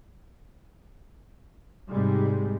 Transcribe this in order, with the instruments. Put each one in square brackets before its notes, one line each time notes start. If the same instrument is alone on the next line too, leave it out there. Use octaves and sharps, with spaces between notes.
[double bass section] G#2 C3 G3 G#3